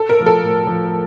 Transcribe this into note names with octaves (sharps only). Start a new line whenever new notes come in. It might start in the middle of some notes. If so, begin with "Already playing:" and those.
Already playing: A4
A#4
F3 A3
A4
A2
F3 A3